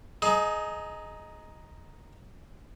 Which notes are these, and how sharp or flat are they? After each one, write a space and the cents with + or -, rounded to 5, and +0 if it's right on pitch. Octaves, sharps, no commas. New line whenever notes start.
D#4 +0 G#4 +25